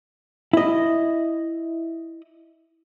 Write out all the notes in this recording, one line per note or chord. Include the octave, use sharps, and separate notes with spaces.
E4 D#5